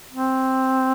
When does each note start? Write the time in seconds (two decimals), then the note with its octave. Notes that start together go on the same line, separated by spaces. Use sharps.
0.13 C4